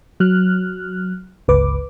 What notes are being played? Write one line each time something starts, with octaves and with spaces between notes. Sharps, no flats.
F#3 F6 F#6
G1 C#2 B4 D6